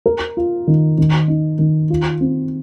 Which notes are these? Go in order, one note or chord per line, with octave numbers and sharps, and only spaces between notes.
A#4
F4
D#3
D#3
D#4
D#3
F4
C4